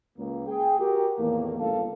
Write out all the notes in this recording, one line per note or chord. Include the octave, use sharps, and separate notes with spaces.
C#2 A#3
G#4 G5
F#4 G4 A#4
E2 A2 D#3 A3 A#3
G1 C#2 A#3 A4 F5